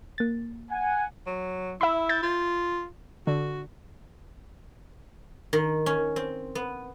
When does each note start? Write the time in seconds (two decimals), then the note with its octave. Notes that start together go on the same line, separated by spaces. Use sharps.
0.18 A#3 A6
0.71 F#5 G#5
1.27 F#3
1.81 E4 E5 B5
2.09 G6 A6
2.23 F4
3.27 D3 F#4
5.53 D#3
5.86 C#4
6.16 C4
6.55 B3